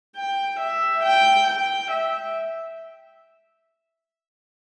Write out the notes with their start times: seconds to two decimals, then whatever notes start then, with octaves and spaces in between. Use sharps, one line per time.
0.16 G5
0.60 E5
1.03 G5
1.47 G5
1.91 E5